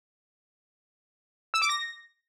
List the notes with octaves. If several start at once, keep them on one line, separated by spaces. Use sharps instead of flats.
E6
D6
A#6